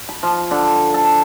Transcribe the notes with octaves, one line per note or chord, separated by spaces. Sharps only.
B5
F3
D3
A4